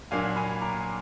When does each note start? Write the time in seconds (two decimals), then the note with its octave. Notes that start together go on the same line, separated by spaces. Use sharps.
0.11 A#2 F#3 A#3 D4 F5 G#5
0.36 G#5 B5
0.61 A#5 D6